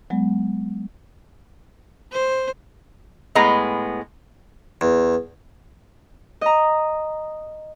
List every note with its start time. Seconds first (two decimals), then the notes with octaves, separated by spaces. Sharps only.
0.10 F#3 G#3 B3
2.13 C5
3.35 A2 G#3 B3 A#5
4.81 E2
6.41 D#5 A#5